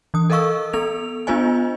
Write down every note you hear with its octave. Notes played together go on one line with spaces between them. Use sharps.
E3 D#6
A4 A#4 D#5 F5 C#6 E6
B3 A4 F7
B3 D4 F4 C5 D#5 G#5